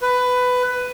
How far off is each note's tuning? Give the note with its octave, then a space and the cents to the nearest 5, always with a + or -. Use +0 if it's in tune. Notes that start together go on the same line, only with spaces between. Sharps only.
B4 +15